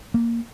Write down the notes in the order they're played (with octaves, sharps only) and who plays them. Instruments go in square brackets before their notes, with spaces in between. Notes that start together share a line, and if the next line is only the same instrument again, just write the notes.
[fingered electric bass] A#3